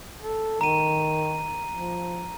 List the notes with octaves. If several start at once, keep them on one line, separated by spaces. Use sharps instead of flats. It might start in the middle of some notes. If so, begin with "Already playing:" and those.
A4
D#3 A#5 D#7
F3